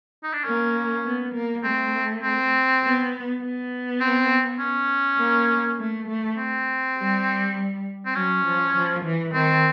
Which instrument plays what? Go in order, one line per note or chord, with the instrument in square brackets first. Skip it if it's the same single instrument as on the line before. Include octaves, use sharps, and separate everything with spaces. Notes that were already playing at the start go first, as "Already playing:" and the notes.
[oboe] D#4
D4
[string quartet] A#3 [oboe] C#4
[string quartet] B3
A#3
[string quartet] A3 [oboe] C4
[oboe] C4
[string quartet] B3
B3
[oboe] C4
C#4
[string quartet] A#3
A3
A3
[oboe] C4
[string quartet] G3
[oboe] C4
[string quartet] F#3 [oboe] C#4
[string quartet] F3
F3
E3
[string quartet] D#3 [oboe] C4